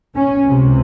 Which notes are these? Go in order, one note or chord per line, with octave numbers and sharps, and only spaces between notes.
C#4
C#2 C3